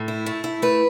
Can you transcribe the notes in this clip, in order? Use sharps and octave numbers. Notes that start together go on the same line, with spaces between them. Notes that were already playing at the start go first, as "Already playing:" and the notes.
Already playing: A2 A4
E4
A3
E4
A3 B4